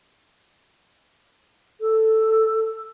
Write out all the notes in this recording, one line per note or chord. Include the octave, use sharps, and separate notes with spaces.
A4